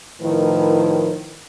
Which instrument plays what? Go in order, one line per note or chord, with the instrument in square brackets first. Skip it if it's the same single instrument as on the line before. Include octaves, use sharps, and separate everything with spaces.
[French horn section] A2 D#3 F3 E4 A#4 B4